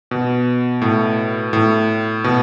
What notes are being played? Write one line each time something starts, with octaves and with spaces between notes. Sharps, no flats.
B2
A2
A2
B2